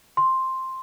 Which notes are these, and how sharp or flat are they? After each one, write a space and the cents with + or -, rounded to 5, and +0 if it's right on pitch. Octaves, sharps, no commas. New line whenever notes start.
C6 +5